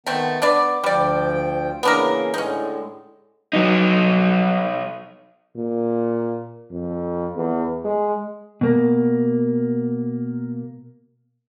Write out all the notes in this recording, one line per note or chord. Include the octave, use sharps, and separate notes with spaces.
D#3 A3 B3 C4
B3 D4 B4 D5
D2 F3 G3 D5 G5
C#3 E3 A#3 B3 D4 A#4
A2 D3 G#3 C#4 D#4
F#3 D#4
A#2
F2
E2
G#3
B2 A#3